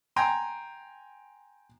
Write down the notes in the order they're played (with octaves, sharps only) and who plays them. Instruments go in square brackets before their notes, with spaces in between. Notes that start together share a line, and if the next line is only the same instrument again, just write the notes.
[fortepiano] G5 G#5 A#5 C6